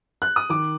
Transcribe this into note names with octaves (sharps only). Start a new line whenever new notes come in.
F#6
D#6
D#3 D6